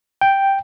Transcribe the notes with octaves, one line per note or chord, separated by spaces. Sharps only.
G5